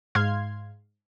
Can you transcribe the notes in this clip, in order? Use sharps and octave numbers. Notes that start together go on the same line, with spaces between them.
G#2 F5 C6 F6 G#6 C7